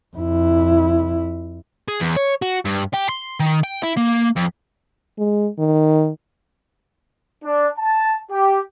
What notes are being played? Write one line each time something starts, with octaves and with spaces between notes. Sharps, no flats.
F2 E4
G#4
E2
C#5
F#4
G2
G4
C6
D#3
G5
E4
A#3
F2
G#3
D#3
D4
A5
G4